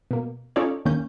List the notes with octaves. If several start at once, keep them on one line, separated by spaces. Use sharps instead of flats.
B2 A#3
C#4 D#4 F4 A4 C#5 D5
D#2 D#3 A#3 C#4 G6